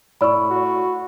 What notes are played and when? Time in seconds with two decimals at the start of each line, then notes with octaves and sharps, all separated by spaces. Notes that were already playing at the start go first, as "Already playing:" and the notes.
0.21 A2 D5 B5 C#6 E6
0.51 F#4